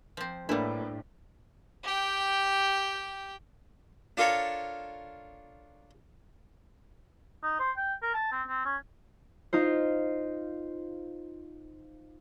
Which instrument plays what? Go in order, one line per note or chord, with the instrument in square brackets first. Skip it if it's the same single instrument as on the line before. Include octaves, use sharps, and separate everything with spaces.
[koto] F3 C4
[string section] A2 [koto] G3 E4 [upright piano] A#3 A4 B4 [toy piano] D4
[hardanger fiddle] G4 G5
[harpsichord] D4 F4 A4 A#4 C#5
[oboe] D#4
C5
G5
A#4
A5
C4
C4
C#4
[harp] D#4 F4 C5